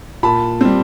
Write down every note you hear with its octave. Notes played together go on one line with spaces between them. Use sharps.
A#2 A5 B5
G3 C4